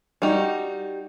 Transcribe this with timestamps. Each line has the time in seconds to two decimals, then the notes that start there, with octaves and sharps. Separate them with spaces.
0.22 G3 D#4 F#4